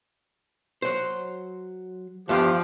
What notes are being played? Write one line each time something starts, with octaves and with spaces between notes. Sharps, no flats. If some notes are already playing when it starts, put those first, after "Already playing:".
F#3 C5
E2 G2 F3 F4 G4